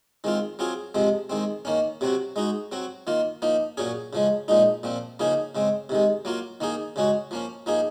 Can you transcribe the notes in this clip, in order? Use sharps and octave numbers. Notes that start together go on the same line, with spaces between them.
D#3 G#3 C4 F4
F#3 C4 F4 G#4
C3 F3 G#3 C4
D#3 G#3 C4
D#3 A#3 C#4
C3 F#3 C4 F#4
G#3 D#4 F#4
F#3 C4 F#4
D#3 A#3 F4
F3 A#3 D#4
A#2 F#3 C#4 G#4
C#3 F3 G#3
A#2 F3 G#3 D#4
A#2 F3 C4
C#3 F3 A#3 D#4 G#4
C#3 G#3 C4
C3 D#3 G#3
F#3 A#3 F4
D#3 A#3 D#4 G#4
C#3 G#3 C#4 F#4
F3 A#3 C#4
F3 A#3 D#4 G#4